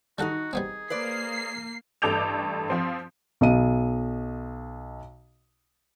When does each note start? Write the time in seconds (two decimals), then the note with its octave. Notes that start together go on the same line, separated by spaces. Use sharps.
0.18 D#3 G3 D#4 F#4 A4 F#5
0.53 G3 B3 C4 G#4
0.90 A#3 B4 C5 D5 C7
2.02 A1 G2 A4 D6 G6 F7
2.68 F3 C4 C6
3.41 B1 D#5 D#7